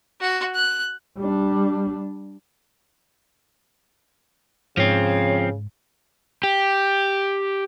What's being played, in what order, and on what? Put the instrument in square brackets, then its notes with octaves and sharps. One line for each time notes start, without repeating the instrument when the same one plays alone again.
[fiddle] F#4
F#6
[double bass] G3 D4
[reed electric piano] G#2 [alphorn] C#3 [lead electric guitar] F3 C4 [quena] C#5
[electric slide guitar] G4